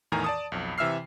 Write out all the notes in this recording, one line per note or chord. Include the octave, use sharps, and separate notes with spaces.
E2 A2 D#3 A#4 G#5 A#5
D5 A5 D#6
B1 F2
C3 E3 E5 E6 F6 C7